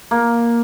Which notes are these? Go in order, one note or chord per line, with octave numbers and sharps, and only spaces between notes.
A#3